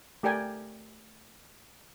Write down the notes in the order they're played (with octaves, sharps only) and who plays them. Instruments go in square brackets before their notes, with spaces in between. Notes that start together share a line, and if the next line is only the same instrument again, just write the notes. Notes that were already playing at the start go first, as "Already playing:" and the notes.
[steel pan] A3 G4 A#4 D5 G5 G#5